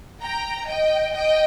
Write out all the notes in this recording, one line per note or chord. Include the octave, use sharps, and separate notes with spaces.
G5 A#5
D#5 G5
D#5 G5